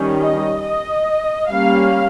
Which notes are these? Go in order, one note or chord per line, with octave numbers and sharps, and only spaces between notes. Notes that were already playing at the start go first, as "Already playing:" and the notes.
Already playing: D#3 G3 C#4
D#5
D#5
G3 A#3 C#4 F5